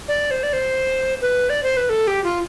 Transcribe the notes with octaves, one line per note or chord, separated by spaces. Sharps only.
D5
C5
D5
C5
B4
D5
C5
B4
A4
G4
F4